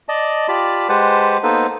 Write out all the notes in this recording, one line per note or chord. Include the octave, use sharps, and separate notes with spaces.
D5 D#5 A5
F4 G4 D5 A5 B5
G#3 G4 B4 C5 F#5 A5
A#3 B3 D#4 A4 B4 C5